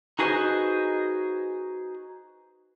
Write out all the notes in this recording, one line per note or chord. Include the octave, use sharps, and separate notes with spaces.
D#4 F#4 G#4 B4 C5 D#5